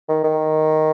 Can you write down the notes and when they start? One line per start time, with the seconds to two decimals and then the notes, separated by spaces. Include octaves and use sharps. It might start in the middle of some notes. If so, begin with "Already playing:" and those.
0.09 D#3
0.24 D#3